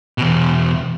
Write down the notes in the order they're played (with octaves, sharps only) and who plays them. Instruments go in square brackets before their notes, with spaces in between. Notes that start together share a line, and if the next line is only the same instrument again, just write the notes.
[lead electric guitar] E2 B2